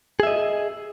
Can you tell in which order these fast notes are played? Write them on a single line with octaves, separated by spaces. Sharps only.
G#4 E5 D#5